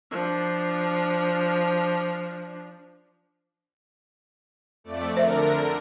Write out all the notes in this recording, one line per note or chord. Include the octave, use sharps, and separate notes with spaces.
F3 D4
F2 A3 D5
D3 A#4 C5 E5